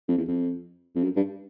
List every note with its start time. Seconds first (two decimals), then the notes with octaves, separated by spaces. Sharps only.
0.08 F2
0.17 E2
0.28 F2
0.96 F2
1.03 F#2
1.16 G2